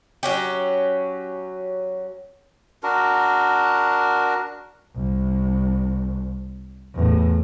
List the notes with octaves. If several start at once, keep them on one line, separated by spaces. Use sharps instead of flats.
F#3 C#4 G4
D4 F#4 A#4
C2
E2 A2